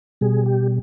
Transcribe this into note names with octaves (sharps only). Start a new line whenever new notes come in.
B2 G3 G#4
G4